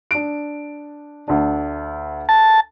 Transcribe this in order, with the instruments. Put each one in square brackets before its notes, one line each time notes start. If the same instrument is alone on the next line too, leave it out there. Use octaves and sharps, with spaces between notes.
[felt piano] D4 D7
D2 D4
[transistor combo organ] A5